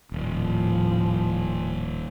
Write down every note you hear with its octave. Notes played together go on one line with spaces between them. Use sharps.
D#1 A2 F3